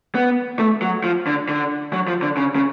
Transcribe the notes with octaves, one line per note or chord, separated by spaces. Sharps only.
B3
A3
F#3
F3
D3
D3
F#3
F3
D3
C#3
C#3